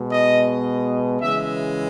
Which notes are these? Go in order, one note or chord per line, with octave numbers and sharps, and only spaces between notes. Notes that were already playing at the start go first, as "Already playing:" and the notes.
Already playing: B2 G#3
D#5
C#3 E3 G#3 E5